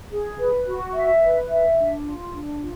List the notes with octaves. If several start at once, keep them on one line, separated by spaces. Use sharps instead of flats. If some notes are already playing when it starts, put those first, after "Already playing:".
G#4
B4
F#4
E5
B4
E5
D4
F4
D4
F4